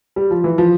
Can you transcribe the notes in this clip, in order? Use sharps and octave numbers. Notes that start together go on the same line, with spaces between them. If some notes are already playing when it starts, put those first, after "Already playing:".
G3
F3
E3
F3